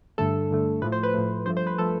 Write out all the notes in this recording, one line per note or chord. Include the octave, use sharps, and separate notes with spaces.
G2 D3 A3 A4
G2 D3 A3
A2 F3 A3 B4
C5
B4
A2 F3 A3
G2 F3 A3 C5
C5
B4
F3 A3 A4